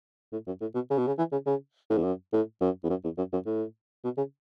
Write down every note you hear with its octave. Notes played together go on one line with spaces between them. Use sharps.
A2
F#2
A2
B2
C#3
B2
C#3
E3
C#3
C#3
A2
E2
F#2
A2
F#2
E2
F#2
E2
F#2
F#2
A2
B2
C#3